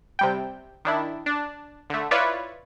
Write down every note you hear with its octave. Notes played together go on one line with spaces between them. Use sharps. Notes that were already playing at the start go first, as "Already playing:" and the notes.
C3 G3 G5
D#3 D4 E4
D4
D3 A3
E4 F4 B4 C#5 D5 E5